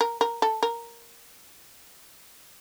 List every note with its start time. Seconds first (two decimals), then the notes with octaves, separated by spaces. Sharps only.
0.01 A#4
0.21 A#4
0.42 A4
0.63 A#4